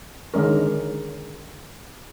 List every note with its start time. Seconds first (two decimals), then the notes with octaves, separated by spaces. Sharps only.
0.34 D3 D#3 G#3 C#4 A#4